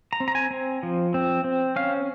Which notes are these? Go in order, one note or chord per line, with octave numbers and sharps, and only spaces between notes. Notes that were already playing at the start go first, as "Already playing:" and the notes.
A#5
C4
A#5
G#5
C4
F3
C4
C4
C#4 F5